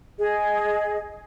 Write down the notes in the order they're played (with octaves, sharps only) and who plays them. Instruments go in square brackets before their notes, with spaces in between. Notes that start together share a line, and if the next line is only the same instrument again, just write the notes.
[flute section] G#4 D#5